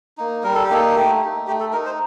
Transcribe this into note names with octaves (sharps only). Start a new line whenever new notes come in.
A#3 D#4
G3 A#4
A4
G4
A#3 D#4 A4
A3 G4
D#4
A3 G4
A4
D#4 A#4
C5